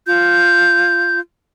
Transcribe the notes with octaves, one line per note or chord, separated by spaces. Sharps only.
F4 G6